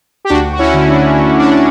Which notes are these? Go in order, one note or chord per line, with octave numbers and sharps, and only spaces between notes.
G4
D2 D4 F#4
F#4
C#4 E4
D3 A3
D4
D2
D4